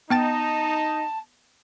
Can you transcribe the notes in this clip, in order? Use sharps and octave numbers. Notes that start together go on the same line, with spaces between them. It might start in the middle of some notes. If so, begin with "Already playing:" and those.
B3 D#4 G5 A5 A6